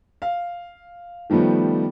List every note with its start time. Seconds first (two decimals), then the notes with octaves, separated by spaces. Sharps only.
0.22 F5
1.30 D#3 F3 G3 A3 B3